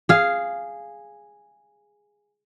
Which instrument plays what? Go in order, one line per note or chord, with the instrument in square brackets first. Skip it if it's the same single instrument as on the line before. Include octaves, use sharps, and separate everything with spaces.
[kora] G#4 F5